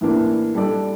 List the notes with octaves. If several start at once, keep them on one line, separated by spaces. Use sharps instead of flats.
A2 E3 A#3 D4
G3 D4 A4 D5